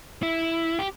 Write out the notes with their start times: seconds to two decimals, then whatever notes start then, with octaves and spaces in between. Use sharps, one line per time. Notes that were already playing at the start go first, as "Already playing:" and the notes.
0.23 E4
0.79 G4